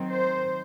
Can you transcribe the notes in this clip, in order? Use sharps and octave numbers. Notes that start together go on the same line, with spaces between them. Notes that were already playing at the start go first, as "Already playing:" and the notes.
Already playing: D#3 F#3 C4
C5